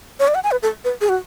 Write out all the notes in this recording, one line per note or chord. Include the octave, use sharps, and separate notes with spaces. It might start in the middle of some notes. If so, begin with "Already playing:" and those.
C#5
D5
F#5
G#5
B4
A4
B4
G#4
F#4